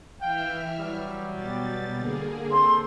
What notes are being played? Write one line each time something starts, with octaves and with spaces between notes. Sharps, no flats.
E3 E5 F5 G5 F6
F#3 G3
B2 A6
D3 A#3 G#4
C4 A4 C6